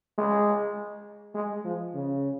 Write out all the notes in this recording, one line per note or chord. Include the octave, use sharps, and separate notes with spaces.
G#3
G#3
F3
C#3